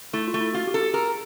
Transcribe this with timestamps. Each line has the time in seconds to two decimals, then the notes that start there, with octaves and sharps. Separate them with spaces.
0.13 A3 E4
0.28 F4
0.34 A3
0.41 E4
0.54 F4 F#4
0.67 G4
0.74 A4
0.81 G4
0.94 G#4 A#4